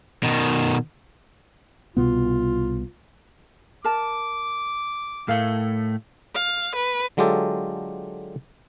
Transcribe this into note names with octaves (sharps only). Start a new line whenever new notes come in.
B2 D#3
C2 B2 B3 F4
A#4 A5 D6
A2 A3 A#4 F5
F5
B4
D3 F#3 G#3 F4 G4 A4